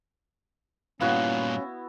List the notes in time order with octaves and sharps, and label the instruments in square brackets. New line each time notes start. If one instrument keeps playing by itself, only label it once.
[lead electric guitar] G2 A#2 [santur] B3 E4 F#4 [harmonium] C#4 [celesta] F5 F#6